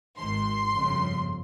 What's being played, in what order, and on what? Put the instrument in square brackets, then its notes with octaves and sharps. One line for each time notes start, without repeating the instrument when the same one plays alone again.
[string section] G#1 G#2 D#3 C6
G1 F2 C#3